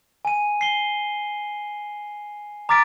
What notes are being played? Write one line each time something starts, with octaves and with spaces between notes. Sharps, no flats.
G#5 D#7
C7 G7
A#5 D6 F6 A6 B6 D7